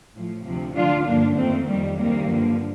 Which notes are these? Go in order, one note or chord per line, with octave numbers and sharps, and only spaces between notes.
A2 F3
D2 C3 F3
D2 D3 F3 D4 F4
G2 D3 F3 A#3 D4
F2 D#3 A3 C4
F2 D#3 G3 A#3
D2 C3 D#3 G3 A#3
G2 D3 F3